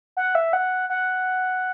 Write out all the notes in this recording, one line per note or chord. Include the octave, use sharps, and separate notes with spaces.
F#5
E5
F#5
F#5